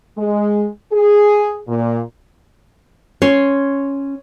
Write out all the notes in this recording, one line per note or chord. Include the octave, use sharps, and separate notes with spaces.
G#3
G#4
A#2
C#4 C#5 C6